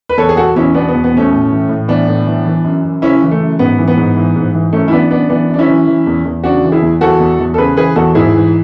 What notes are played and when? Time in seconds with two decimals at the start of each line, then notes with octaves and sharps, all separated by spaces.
0.09 B4
0.17 E2 A4 C#5
0.29 G#4
0.37 B2 F#4 A4
0.56 E2 C#4 E4
0.74 B2 B3 D4
0.88 B3
0.94 E2
1.04 B3
1.13 B2 A3 C#4
1.32 A2
1.51 E3
1.69 A2
1.88 E3 B3 D4
2.07 A2
2.27 E3
2.46 E3
2.64 F#2
2.84 F#2
3.02 C#3 C#4 E4
3.22 E3
3.31 A3
3.40 F#2
3.59 G#2 B3
3.78 E3
3.88 B3
3.97 G#2
4.17 E3
4.36 G#2
4.55 E3
4.73 F#2 A3 C#4
4.88 E4
4.92 E3 B3 D4
5.11 F#2 B3 D4
5.30 E3 B3 D4
5.49 F#2 D4
5.59 C#4 E4
5.68 E3
5.87 E3
6.07 E2
6.25 E2
6.43 C#3 D4 F#4
6.64 E3
6.72 E4 G#4
6.82 E2
7.01 E3 F#4 A4
7.19 E2
7.39 E2
7.54 A4
7.57 C#3 G#4 B4
7.77 E3 G#4 B4
7.96 E2 F#4 A4
8.15 G#2 E4 G#4
8.34 E3